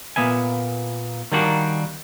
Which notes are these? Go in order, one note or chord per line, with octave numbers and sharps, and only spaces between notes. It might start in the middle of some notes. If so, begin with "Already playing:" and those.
A#2 A#3 B3 E5 G#5
D#3 G3 A#3 D4 F#4